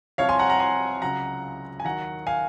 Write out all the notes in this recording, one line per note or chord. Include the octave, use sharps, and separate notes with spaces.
C2 C3 F3 C#5 F5
G#5 C6
F#5 A#5
F#5 A#5
G#5 C6
C#2 C#3 F#3 F#5 A#5
G#5
D#2 D#3 F#3 F#5 A#5
F5 G#5